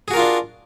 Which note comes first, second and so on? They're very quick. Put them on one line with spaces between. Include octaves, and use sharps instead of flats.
G#4 F#4 A#4 F4 D4